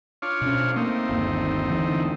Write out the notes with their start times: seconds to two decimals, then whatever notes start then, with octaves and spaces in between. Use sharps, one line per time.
0.22 D4 F4 C#5
0.42 B2 C#4
0.76 A3 A#3 C4 D#4
1.09 G1 D#2
1.69 E2 D3 E3